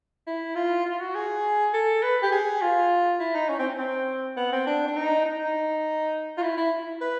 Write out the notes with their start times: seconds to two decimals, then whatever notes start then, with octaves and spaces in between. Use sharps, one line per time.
0.27 E4
0.55 F4
0.86 F4
1.00 F#4
1.15 G#4
1.74 A4
2.03 B4
2.22 G4
2.32 G#4
2.61 F4
3.20 E4
3.35 D#4
3.50 C#4
3.59 C4
3.79 C4
4.37 B3
4.52 C4
4.67 D4
4.87 D4
4.96 D#4
5.26 D#4
6.38 F4
6.42 E4
6.57 E4
7.01 B4